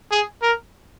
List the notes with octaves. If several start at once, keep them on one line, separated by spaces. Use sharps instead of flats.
G#4
A#4